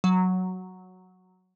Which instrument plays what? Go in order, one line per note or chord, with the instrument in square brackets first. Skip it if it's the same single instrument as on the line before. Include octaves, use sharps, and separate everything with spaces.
[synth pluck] F#3